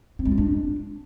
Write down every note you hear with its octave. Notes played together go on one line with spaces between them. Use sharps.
C4
G#3
F4
D4